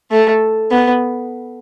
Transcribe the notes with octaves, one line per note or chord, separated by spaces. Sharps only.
A3
B3